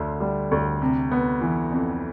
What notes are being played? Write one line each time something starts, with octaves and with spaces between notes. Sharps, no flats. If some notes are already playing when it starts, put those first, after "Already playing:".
Already playing: D2 D3
G3
D2
C3
B3
E3
F2